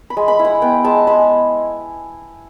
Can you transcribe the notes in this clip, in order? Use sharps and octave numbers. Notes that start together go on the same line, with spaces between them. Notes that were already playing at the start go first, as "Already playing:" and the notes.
B5
G#3
B5
E4
F#5
B3 G5
G#3 A5
G#3 B5